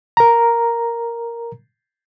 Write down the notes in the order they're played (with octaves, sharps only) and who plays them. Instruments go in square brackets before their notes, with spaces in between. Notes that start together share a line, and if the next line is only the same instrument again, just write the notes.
[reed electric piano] A#4 A#5